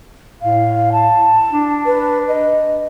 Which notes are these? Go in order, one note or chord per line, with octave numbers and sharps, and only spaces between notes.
A2 F5
A5
D4
B4
D#5